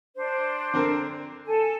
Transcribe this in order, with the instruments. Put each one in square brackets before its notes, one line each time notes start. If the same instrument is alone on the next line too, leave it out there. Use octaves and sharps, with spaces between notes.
[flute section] D4 C5
[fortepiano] D3 C4 A#4
[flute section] A4 G#5